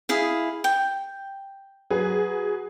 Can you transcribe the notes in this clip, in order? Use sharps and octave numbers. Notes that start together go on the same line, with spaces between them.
E4 G#4 F5
G5
F#3 G#4 B4